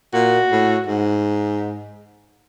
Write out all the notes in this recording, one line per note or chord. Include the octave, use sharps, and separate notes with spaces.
A#2 F#4
A2
G#2